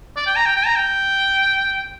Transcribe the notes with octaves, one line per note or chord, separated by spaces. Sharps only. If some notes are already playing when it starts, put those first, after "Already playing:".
D5
G5
A#5
G5
G5
A#5
G5